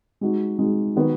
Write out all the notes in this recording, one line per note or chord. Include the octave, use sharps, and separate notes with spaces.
G#3 D#4 F#4
G#3 D#4 F#4
D#3 F#3 B3 F#4